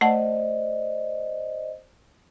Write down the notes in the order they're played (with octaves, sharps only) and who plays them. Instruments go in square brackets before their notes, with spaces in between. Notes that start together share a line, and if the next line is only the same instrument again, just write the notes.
[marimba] A3 F#5 A5 [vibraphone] C5 D5 D#5